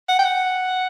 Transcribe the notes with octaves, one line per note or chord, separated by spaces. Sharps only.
F#5
G5
F#5